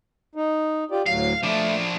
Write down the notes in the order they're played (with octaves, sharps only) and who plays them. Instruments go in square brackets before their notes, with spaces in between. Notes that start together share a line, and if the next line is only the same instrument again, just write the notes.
[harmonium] D#4
F4 G4 D5
[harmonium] D2 A2 F#3 [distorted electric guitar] F5
[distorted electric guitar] F3 D4 [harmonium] A3